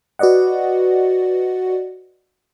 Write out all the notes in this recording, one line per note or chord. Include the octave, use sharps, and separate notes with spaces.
F#4 B4 D5 D#5 F#5